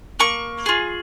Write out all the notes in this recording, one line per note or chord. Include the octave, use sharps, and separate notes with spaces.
A#3 C#6
F4 G#4